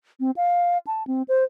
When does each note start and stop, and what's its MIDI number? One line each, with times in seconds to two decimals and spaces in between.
0.20 0.31 60
0.37 0.78 77
0.87 1.03 81
1.07 1.22 60
1.28 1.44 72